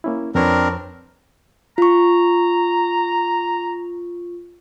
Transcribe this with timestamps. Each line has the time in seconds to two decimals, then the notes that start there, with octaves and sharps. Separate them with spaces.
0.04 A#3 C#4 E4
0.35 F2 C4 D4 A#4 B4 C#5
1.78 F4 A#5 C#6